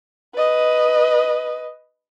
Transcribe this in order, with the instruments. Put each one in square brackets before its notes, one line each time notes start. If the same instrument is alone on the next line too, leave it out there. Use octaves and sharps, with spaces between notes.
[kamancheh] B4 D#5